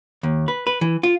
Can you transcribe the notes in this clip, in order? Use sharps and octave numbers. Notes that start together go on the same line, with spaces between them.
D#2
B4
B4
E3
F4